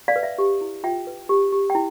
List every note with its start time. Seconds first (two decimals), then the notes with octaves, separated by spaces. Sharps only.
0.08 D5 F5
0.16 B4
0.23 E5
0.38 G4
0.61 E4
0.84 F4 E5 G5
1.07 B4
1.29 G4
1.52 G4
1.70 G5
1.75 E4